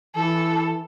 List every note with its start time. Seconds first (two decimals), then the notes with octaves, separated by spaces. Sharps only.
0.15 E3 A4